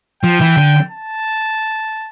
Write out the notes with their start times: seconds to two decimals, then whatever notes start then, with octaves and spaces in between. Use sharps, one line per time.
0.23 F3 G5
0.41 E3
0.57 D3
0.91 A5